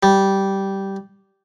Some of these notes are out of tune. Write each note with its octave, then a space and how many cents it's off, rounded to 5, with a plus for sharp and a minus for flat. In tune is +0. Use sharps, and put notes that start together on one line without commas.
G3 -10